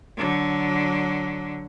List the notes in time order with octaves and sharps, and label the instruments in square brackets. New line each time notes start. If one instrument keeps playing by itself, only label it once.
[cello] D3 F#3